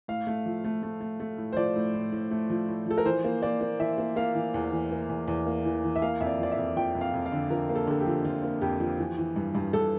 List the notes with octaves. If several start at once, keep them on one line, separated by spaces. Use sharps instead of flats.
A2 F5
A3
F3
A3
A3
A3
A3
A2
C5
F3 D5
A2
A2
A2
A3
F3
A2
F3 A4
A#4
E3 C5
A#3
A#3 D5
A#3
E3 E5
A#3
A#3 F5
E3
E2
E3
A#3
E2
E2
A#3
E3
E3
E5
A#3 F5
F2 E5
D5
F3 D5
E5
F2
F3 G5
F2
F5
F2
F5
D3
F3 A#4
A#3
A4
D3 A4
G4
F3
F3 F4
A#3
F2 G4
F3
E3
E3
G2
G2
G2 A4